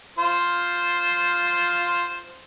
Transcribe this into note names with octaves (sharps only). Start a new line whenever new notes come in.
F4 C5